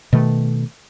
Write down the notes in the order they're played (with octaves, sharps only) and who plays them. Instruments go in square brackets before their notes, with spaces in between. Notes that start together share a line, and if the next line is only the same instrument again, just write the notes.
[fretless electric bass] B2 D#3 A3